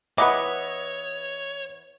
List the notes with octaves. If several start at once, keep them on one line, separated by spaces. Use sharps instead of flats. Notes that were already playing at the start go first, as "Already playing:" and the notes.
E3 B3 B4 C#5 D#5 F#5 D6